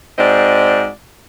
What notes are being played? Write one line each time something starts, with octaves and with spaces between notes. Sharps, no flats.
G#2 C4 F#4 D5 D#5